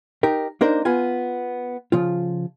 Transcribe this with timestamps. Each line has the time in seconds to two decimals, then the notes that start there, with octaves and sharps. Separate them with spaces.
0.23 D#4 G4 A#4
0.61 A#3 D4 D#4 A#4 C5
0.85 B3 F4 G#5
1.92 C#3 F3 F4